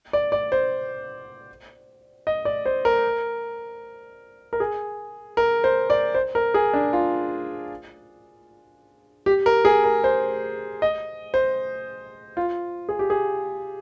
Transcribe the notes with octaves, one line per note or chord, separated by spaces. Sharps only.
D5
D5
C5
D#5
D5
C5
A#4
A#4
G#4
A#4
C5
D5
C5
A#4
G#4
D4
F4
G4
A#4
G#4
A#4
C5
D#5
C5
F4
G#4
G4
G#4